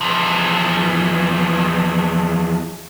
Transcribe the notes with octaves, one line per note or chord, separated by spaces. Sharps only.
E2 F3